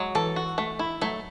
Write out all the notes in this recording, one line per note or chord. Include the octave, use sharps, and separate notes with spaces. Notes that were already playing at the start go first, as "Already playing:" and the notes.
Already playing: F#3 G#3
E3 A4
F#4
A3
E4
F#3 A3